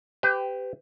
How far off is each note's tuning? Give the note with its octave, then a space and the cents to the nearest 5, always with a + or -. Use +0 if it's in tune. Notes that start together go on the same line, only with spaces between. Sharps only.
G4 +0 B4 +40